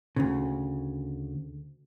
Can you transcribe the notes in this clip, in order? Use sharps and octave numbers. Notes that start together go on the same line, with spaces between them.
D2 A2 C#3